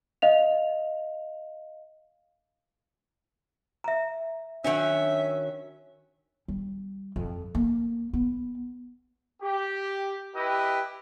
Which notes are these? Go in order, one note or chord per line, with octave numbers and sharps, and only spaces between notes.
D#5 F5 F7
E5 A#5
D#3 F#3 C#4 D4 E5
G3
F2
A#3
B3
G4
E4 G4 B4 D#5